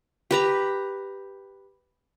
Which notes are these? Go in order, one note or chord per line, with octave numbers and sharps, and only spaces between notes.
G4 B4 A#5